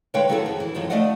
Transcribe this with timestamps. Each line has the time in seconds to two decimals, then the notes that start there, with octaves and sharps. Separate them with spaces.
0.14 D3 G#3 B4 C#5 F5 G5
0.29 D#3 F#3 D#4 E4 G#4 A4
0.46 F2
0.60 E3
0.75 F#2 D#3 F3 F#3
0.90 A3 D4 D5 D#5 F5 F#5